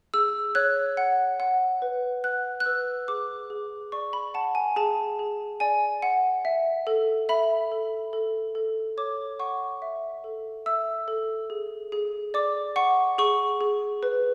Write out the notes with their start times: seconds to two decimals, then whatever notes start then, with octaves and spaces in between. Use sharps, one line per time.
0.14 G#4 E6
0.55 C#5 F#6
0.97 F#5
1.40 F#5
1.82 B4
2.24 F#5 F#6
2.60 F#6
2.66 B4 E6
3.08 G#4 D6
3.50 G#4
3.92 D5 C#6
4.13 B5
4.34 F#5 A5
4.55 G#5
4.76 G#4 A5
5.19 G#4
5.60 D5 G#5
6.02 F#5
6.45 E5
6.87 A4
7.29 E5 B5
7.72 A4
8.13 A4
8.55 A4
8.97 C#5 D6
9.39 F#5 C#6
9.82 E5
10.24 A4
10.66 E5 E6
11.08 A4
11.50 G#4
11.92 G#4
12.34 D5 D6
12.76 F#5 C#6
13.18 G#4 C#6
13.61 G#4
14.03 B4